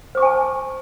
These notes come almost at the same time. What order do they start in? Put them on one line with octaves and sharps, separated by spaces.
C5 D6 C#6 G#5 A5